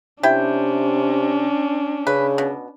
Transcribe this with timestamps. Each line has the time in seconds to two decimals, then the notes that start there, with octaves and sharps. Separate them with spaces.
0.23 C3 C#4 D4 E4 G5
2.07 C#3 B4
2.38 B2